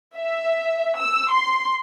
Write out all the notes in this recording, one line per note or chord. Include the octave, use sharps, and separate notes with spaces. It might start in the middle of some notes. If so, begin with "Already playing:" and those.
E5
E6
C6